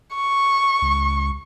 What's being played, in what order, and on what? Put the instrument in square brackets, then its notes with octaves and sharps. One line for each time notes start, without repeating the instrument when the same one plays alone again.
[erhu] C#6
[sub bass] C#2